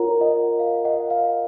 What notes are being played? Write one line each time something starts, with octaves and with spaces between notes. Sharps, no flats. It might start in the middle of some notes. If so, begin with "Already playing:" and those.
Already playing: F4 A#4 C#5 F#5 A#5
D#5 F#5
F5
D#5 F#5
F5